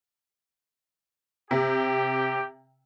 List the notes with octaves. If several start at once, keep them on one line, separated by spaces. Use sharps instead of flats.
C3 G4